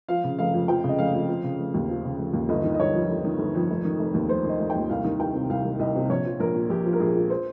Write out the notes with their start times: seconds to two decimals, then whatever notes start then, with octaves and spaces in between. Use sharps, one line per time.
0.08 F3 F5
0.24 C#3
0.39 F1 F5
0.54 F2
0.68 F3 G5
0.84 C#3 D#5
0.99 F1 F5
1.14 F2
1.28 F3
1.44 C#3
1.59 F1
1.74 D#2
1.89 F3
2.05 C#3
2.19 F1
2.33 D#2
2.49 G1 D#5
2.64 D#3
2.74 D#5
2.79 G1 C#5
2.94 F2
3.10 G1
3.25 D#3
3.39 G1
3.55 F2
3.70 F1
3.85 D#3
3.99 F1
4.14 D#2
4.29 F1 C5
4.45 D#3 D#5
4.59 F1
4.70 G5
4.75 D#2
4.89 C2 F5
5.04 D#3
5.20 C2 G5
5.34 C3
5.49 C2 F5
5.65 D#3
5.79 C2 D#5
5.95 C3
6.09 A#1 C#5
6.25 F3
6.40 A#1 A#4
6.55 A#2
6.69 A#1 G4
6.86 F3
6.93 A#4
7.00 A#1 G#4
7.15 A#2
7.30 C5